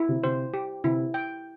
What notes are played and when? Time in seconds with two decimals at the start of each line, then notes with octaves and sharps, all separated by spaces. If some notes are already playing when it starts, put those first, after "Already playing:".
Already playing: E4
0.08 C3
0.24 C3 C5
0.54 G4
0.84 C3 E4
1.14 G5